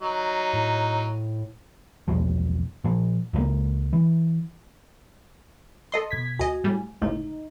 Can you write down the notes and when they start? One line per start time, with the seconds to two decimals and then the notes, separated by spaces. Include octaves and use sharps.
0.02 F#3 D#4
0.53 A2
2.08 B1 E2 B2 F3
2.84 A#2 F3
3.33 C#2 C#3 E3 A#3
3.93 E3
5.92 A4 D#5 C6
6.11 B2 G#6 B6
6.39 D2 F#4 D#5 G#5
6.64 A2 G3
7.02 G1 C#2 A2 D#4